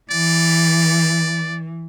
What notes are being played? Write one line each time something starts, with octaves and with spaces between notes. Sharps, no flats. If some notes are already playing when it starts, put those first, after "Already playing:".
E3 D5